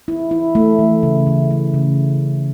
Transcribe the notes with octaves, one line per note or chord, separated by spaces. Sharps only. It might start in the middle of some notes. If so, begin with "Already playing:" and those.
E4
E4
A3
E3
C#3
E3
A3
C#3